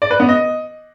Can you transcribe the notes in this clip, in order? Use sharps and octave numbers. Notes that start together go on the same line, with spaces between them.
D5
B4
B3
D#5